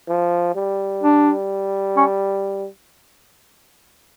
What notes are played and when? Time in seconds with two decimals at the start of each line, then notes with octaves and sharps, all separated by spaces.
0.08 F3
0.55 G3
1.03 D4
1.97 C#4